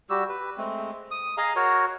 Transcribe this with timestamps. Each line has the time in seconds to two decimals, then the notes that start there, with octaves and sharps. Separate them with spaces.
0.10 G3 F#4 G4 E6
0.29 B4
0.58 G#3 A3 C4
1.11 D#6
1.37 G#4 D#5 F5 A#5
1.56 F#4 A#4 C#5